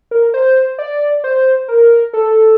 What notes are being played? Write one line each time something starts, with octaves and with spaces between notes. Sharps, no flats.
A#4
C5
D5
C5
A#4
A4